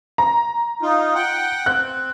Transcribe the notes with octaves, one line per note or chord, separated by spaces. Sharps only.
A#5
D#4 F4
F#5 G5
C4 F#6